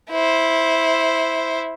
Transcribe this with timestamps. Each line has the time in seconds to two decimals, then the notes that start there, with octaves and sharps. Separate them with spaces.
0.11 E4 C5